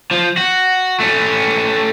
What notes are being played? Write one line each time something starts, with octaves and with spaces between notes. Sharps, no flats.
F3
F#4
A3 C#4